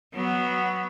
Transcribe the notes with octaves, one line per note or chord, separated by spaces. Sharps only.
F#3 B3